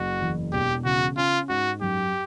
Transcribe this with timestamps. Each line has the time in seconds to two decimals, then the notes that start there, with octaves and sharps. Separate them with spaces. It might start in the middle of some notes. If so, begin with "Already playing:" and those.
Already playing: F#1 F#4
0.20 E2
0.52 E1 G4
0.85 C#3 F#4
1.17 C#4 F4
1.49 G#2 F#4
1.82 F#2 G4